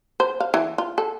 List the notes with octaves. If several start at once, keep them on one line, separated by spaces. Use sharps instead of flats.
C5
F5
E3
F4
A4